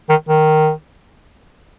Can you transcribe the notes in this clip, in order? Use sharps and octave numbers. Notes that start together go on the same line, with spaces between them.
D#3
D#3